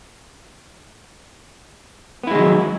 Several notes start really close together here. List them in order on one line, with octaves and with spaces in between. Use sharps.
B3 E4 G#3 D#3 F#3